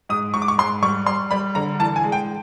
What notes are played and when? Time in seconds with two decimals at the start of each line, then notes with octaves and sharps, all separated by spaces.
0.09 G#2 D#6
0.34 G#2 C#6
0.42 D6
0.48 C#6
0.58 G#2 C6
0.83 G3 C#6
1.06 G3 C6
1.31 G3 B5
1.55 D3 A#5
1.79 E3 A5
1.96 G#5
2.04 G#3
2.12 G5